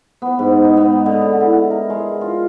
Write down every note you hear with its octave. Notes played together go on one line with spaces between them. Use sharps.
B3
G#2
D#4
B3
D3
D3
E4
A#4
G#3
F4